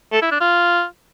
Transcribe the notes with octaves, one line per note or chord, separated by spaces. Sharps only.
A4
E4
D4
F4